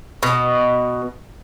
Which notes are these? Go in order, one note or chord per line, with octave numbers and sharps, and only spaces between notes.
B2